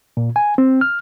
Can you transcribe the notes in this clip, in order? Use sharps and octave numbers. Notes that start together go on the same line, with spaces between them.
A#2
G#5
C4
F6